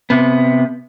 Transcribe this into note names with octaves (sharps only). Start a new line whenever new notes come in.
C3 B3